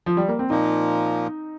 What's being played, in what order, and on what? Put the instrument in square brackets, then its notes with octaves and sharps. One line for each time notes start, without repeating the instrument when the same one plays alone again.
[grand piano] F3
G3
A#3
C4
[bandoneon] A#2 F3 A#3 [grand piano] D#4